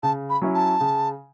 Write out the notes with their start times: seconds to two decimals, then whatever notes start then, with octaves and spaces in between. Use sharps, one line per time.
0.03 C#3 A5
0.29 B5
0.42 F#3 C#4 E4
0.54 A5
0.80 C#3